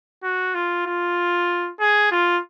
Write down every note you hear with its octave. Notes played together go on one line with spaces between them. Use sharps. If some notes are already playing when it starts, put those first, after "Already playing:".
F#4
F4
F4
G#4
F4